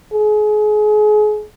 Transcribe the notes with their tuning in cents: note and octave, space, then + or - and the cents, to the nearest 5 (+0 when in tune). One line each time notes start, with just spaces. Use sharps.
G#4 +30